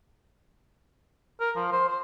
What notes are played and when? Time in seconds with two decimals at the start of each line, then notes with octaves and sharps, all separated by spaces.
1.40 A#4
1.56 F3
1.72 C5
1.88 C5